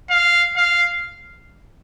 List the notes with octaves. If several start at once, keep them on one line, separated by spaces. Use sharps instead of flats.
F5
F5